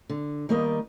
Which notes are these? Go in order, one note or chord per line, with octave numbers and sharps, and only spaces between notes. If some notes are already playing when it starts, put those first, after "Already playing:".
D3
D#3 G3 A#3 B3 A#4 D#5